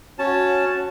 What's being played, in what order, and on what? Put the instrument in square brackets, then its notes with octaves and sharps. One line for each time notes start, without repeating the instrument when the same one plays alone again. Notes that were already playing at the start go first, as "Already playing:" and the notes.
[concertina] C#4 A5 [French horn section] F#4